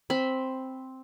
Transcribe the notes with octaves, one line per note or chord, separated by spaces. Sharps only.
C4 B5